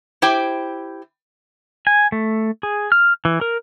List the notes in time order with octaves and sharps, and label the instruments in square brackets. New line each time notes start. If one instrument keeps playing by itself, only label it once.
[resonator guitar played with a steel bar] E4 G4 C5 G5
[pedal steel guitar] G#5
A3
G#4
F6
E3
A#4